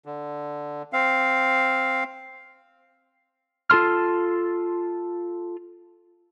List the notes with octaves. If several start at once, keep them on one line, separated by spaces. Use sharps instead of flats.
D3
C4 F5
F4 A4 C6 F6